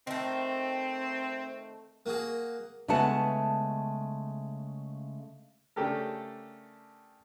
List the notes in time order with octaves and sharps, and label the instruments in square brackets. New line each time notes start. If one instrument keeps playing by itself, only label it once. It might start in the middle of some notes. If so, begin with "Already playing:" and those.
[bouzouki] D#3 A3 [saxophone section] C4
[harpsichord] A#3 F#4 G#4
[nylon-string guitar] C#3 G#3 A3 B3 F#5 A5
[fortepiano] C#3 A3 D4 G4 A4 A#4